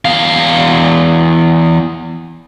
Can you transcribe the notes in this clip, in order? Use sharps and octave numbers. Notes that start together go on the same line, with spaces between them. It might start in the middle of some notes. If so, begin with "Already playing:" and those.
E2 F5